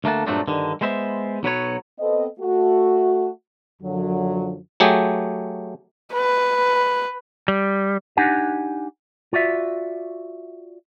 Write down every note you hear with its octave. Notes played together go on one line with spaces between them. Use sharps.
D2 A3 A#3 F#5 A5
G2 A#2 F#3 A3 C4 D4
G2 D3 D#3
G#3 B3 C5 E5
B1 F#3 B4 C#5
B3 C4 A4 D#5
A3 F#4
F#2 D3 F3 F#3
F#3 A3 G4 G#4
B4
G3
D4 D#4 G4 F#5 G#5
F4 F#4 D5 E5